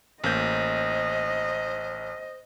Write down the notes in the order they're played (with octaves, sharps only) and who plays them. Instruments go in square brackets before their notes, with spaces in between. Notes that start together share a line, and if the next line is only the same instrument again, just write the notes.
[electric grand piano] A1 A#3 G6 [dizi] C5 [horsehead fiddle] D#5